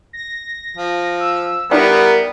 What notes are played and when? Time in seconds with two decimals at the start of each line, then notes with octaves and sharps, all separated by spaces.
0.13 A#6
0.77 F3
1.20 E6
1.71 G3 B3 D4 E4 A#4